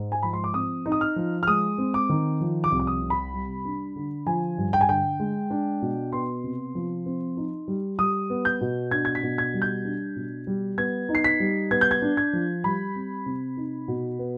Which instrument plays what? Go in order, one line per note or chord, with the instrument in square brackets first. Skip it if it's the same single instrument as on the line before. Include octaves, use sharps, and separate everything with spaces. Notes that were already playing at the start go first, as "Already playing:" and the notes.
Already playing: [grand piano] G#2 G#3
G#5
F3 B5
C6
D6
C4 D#6
D#4
D#6
F6
F3
F6
G#3 D#6
C4
D6
D#3
F3
D6
C2
D6
D#6
C3
B5
G3
D4
D3
F3 G#5
G2
G5
G#5
D3 G5
G#3
D4
B2
B3 C6
C3
F3
C4
D#4
G3
G3 D#6
B3
G6
B2
D4 G#6
G#6
B6
B2
G#6
G3
G6
D4
B2
G3
B3 G#6
D#4
C7
B6
G3
B3 G#6
G6
G#6
D4
G#6
F3
G3 B5
C4
C3
D#4
B2
B3